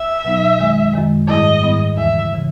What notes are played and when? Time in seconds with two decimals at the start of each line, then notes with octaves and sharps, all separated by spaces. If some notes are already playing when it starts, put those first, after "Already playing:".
Already playing: E5
0.24 B2 F#3 B3 D#4
0.59 F#2 D#3 G#3
0.93 F#2 D#3 G#3
1.28 G#2 D#3 G3 B3 E4 D#5
1.63 G#2 D#3 G3 B3 E4
1.97 E2 C#3 E3 E5
2.34 C#3 E3